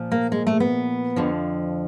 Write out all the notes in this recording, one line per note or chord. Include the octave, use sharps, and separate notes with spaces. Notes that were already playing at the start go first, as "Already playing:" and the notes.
Already playing: A#2 F3
A#3
G#3
A3
B3
F2 D3 F3